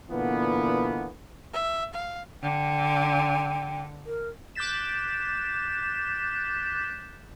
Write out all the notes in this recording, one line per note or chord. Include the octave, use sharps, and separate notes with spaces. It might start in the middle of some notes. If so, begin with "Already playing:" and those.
A#2 D3 E3 A#3 B3
E5
F5
D3 G5
A#4
D6 F#6 G6 A6 B6 E7